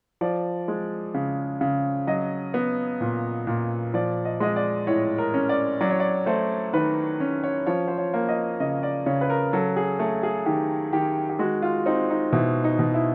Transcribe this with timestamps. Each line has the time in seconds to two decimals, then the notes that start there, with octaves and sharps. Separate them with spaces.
0.21 F3 D5
0.68 G#3
1.14 C#3
1.61 C#3
2.07 F#3 D#5
2.54 B3
3.01 A#2
3.47 A#2
3.94 F3 D5
4.25 D#5
4.40 G#3 D#5
4.56 D5
4.87 A2 C#5
5.18 A#4
5.34 C#4
5.49 D5
5.81 F#3 D5
5.90 C#5
6.00 D5
6.26 A3 C5
6.73 D#3 B4
7.20 C#4
7.44 C#5
7.67 F3 C#5
7.88 C5
7.98 C#5
8.13 A#3
8.29 D#5
8.60 C#3 D#5
8.83 D5
9.06 C#3 C#5
9.21 B4
9.30 A#4
9.53 F#3 A4
9.76 G#4
9.99 A3
10.23 G#4
10.46 D#3 G4
10.93 D#3 G4
11.29 G4
11.39 G#3 F#4
11.62 F4
11.86 C4 D#4
12.10 D#4
12.33 B2 E4
12.64 D#4
12.79 B2
12.94 E4